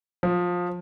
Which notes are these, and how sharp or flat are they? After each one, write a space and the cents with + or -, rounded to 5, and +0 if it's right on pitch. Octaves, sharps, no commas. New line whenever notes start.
F3 +20